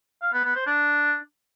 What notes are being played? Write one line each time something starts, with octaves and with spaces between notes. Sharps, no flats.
F5
B3
B3
C5
D4